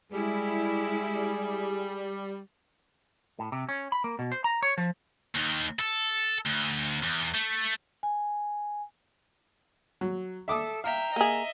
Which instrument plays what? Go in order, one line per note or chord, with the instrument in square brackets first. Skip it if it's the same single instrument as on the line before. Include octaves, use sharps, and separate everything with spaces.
[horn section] G3 [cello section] G#3 E4 [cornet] G#4
[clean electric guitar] A2
C3
C#4
B5
A#3
B2
C5
A#5
C#5
F3
[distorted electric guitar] D#2 D#3
A4
D2
E2
A3
[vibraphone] G#5
[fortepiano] F#3
[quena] A4 [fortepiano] E5 D6 D#6
[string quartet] E5 G5 [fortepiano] F5 [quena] A#5
[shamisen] A#3 G#4 [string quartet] D#5 E5